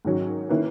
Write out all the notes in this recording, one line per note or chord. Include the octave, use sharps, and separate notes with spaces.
G#2 D#3 F#3 C#4
D#3 A#3 C#4 E4 B4